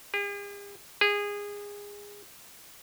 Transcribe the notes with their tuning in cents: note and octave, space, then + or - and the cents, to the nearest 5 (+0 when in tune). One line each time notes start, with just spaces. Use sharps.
G#4 -45
G#4 -20